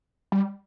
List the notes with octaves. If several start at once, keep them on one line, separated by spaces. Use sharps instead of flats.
G3